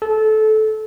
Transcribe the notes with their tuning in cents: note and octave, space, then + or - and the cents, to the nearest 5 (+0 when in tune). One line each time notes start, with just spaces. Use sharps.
A4 -20